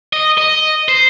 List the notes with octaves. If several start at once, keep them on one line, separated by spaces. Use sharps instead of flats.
D#5
D#5
C5